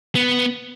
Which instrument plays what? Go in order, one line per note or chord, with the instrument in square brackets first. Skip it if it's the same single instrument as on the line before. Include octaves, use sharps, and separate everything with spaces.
[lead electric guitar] B3